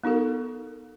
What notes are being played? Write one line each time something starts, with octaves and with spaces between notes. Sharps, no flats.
B3 D#4 F#4 A4 A#4